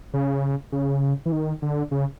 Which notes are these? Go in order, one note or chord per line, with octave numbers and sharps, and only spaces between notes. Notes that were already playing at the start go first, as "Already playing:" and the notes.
C#3
C#3
E3
D#3
D3
C#3